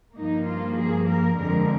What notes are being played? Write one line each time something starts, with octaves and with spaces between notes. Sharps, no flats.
G2 F3 A#3 D#4
F4
G#4
A#4
F2 D3 G#3 A#4